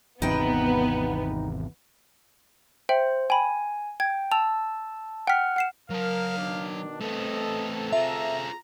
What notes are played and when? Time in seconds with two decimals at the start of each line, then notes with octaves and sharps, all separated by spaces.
0.22 G#1 E2 C3 B3 D#4 G5
2.89 C5 E5 G5 F#7
3.30 G5 G#5 B5
4.00 G5 G#6
4.32 A5 E6 F7
5.27 F#5 G5 F6 B6
5.56 F#5 C7 E7
5.90 F#3 A#4 F5 A5
6.37 B2 D#3 D4
7.01 A3 B3 C4 A4 D#5
7.93 F4 G#4 E5 A#5